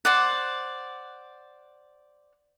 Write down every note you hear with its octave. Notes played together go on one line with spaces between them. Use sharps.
C5 D5 F#5